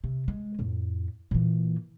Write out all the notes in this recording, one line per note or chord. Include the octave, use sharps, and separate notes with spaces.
C3
G#3
F2 A2
A#2 E3